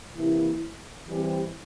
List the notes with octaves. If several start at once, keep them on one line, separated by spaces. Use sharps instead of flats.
C3 E3 A#3 E4
E3 G3 C4 G4 C5